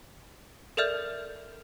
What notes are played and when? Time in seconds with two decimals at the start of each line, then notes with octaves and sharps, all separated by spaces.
0.77 A4 A#4 D5 E5 F6 G6